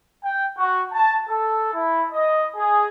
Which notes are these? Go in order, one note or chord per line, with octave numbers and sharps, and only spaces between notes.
G5
F#4
A5
A4
E4
D#5
G#4